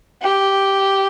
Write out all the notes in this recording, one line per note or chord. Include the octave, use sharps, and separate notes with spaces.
G4